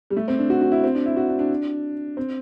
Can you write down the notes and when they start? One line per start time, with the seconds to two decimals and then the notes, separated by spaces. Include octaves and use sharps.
0.10 G3
0.17 A3
0.28 C4
0.39 D4
0.50 F#4
0.61 F#4
0.72 E4
0.84 C4
0.95 D4
1.06 E4
1.17 F#4
1.28 D4
1.39 D4
2.17 C4